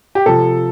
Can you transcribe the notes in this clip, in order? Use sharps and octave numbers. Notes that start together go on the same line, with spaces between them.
G4
C3 F3 A4